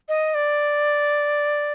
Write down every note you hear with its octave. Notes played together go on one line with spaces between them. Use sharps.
D#5
D5